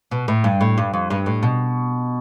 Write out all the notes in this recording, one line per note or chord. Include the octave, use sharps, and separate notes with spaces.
B2
A2
G2
A2
G2
F2
G2
A2
B2